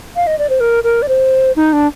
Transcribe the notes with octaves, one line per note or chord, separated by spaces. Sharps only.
F5
D#5
D5
C5
A#4
A#4
D5
C5
D#4
D4